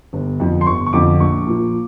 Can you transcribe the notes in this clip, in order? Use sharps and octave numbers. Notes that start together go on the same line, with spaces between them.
G1
F2 D3 F3
C6
G1 C#6
C#6
F2 D3 F3 D6
A#1 C#6
A#2 F3